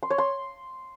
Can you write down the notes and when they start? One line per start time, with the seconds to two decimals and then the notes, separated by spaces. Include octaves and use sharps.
0.03 C6
0.10 C#5
0.18 C6